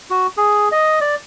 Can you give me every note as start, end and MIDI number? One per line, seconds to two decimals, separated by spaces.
0.10 0.27 66
0.37 0.68 68
0.72 0.99 75
1.01 1.15 74